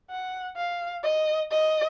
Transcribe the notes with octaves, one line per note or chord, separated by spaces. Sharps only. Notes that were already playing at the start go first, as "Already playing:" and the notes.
F#5
F5
D#5
D#5